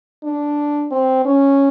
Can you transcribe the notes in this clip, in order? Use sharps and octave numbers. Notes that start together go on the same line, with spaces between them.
D4
C4
C#4